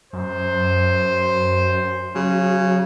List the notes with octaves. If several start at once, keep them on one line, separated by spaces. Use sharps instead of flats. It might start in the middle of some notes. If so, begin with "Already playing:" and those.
F#2 C5
C#3 F#3